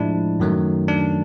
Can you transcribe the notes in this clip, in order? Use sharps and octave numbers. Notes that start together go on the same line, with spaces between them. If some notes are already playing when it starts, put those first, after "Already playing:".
Already playing: A2 F3 G#3 D4 E4
F#2 D#3 F#3 A3
D4